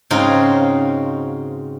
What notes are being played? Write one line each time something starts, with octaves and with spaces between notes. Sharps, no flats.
G#2 C#3 C4 D#4 F4 F#4